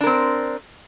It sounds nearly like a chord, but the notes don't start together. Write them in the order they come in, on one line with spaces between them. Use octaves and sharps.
D4 A#4 C4